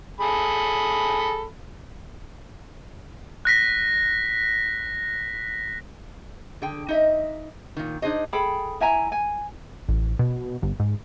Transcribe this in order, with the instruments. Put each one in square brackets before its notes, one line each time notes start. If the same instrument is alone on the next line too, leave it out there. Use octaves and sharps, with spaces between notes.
[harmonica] G#4 A4 B5
[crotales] F#6 A#6 B6
[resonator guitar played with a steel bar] D3 G#4 G5
D#4 D#5 E5
A#2 D#3
D4 D#4 G#4 C5 D#5
[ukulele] G#4 A4 G5 B5
E4 E5 G#5 A#5
G#5
[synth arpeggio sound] A1
B2
G1
G#2